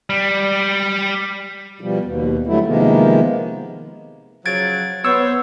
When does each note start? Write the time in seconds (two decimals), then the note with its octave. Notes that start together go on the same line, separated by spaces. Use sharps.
0.10 G3
1.81 B2 F3 G3
2.04 D#2 B2
2.47 D3 F#3 G3 A3 E4
2.67 C3 D#3 F3 G#3 A#3 B3
4.46 C#3 F3 F#3 G#6 A6 D7
5.05 B3 C5 C#5 E6